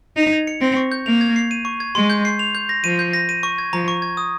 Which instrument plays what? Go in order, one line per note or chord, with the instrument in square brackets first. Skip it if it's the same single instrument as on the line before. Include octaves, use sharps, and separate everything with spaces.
[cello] D#4 [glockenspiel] F7
[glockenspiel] G#6
C#7
[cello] C4 [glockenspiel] A#6
[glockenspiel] C#6
G6
[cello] A#3 [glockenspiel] F7
[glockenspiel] G#6
C7
D#7
C#6
G#6
[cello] G#3 [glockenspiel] C6
[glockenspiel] G6
C7
F7
G6
A#6
[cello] F3 [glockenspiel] D#7
[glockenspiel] G6
A#6
D#7
C#6
G#6
[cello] F3 [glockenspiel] A#5
[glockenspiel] C#6
G#6
D#6